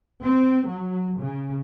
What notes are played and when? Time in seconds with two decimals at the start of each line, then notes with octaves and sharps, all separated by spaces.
0.24 C4
0.67 F#3
1.20 C#3